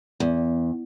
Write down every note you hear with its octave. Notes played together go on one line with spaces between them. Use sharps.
E2